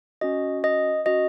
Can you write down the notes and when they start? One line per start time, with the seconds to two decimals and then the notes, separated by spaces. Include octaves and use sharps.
0.21 C#4 F#4 D#5
0.64 D#5
1.06 C#4 F#4 D#5